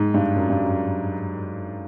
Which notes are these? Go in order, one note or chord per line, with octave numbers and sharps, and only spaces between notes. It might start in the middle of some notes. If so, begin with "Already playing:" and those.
Already playing: G#2
G2
F#2
G2
F#2